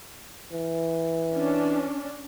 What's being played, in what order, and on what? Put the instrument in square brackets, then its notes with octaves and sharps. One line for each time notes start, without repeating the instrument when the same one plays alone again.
[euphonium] E3
[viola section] C#4 D4